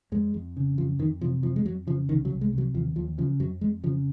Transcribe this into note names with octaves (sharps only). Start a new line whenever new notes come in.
F2 G#3
F2
C#3
F2 F3
F2 D#3
C3 F3
F2 F3
G#3
F2 F#3
C#3 F3
C2 D#3
F#3
C2
G#3
C3
F#3
D#2 F3
D#2 F3
C#3 F3
F2 F#3
F2 G#3
C#3 F3